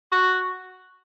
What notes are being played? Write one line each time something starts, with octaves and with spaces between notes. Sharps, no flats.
F#4